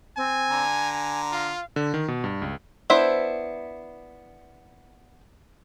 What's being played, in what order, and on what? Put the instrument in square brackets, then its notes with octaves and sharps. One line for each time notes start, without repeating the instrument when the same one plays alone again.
[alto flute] C4 [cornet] G#5
[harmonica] D3 A#5
[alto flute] G#5
[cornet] F4 [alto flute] F5
[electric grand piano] D3
D#3
B2
G2
C#2
[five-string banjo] B3 D4 E4 C5 E5